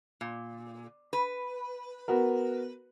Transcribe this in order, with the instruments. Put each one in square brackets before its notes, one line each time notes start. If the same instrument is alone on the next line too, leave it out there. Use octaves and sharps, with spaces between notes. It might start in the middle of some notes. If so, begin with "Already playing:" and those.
[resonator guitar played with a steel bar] A#2
B4
[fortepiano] B3 F#4 A#4